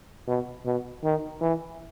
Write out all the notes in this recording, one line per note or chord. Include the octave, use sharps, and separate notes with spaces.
B2
B2
D#3
E3